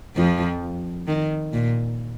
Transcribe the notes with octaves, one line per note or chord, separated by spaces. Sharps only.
F2 F3
D#3
A#2